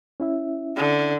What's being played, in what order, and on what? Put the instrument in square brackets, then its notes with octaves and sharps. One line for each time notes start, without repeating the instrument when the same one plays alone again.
[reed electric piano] C#4 E4 E5
[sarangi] D3